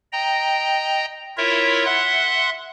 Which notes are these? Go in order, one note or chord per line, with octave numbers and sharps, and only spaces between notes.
D#5 G5 A#5
E4 F4 A#4 C#5 E5
E5 F#5 C6 F#6